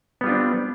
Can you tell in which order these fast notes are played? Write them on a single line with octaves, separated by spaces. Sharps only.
B3 G3 F4 D4 C4